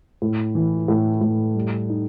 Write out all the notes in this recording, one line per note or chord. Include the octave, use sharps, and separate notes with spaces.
A2
E3
A2
A2
G3
D#4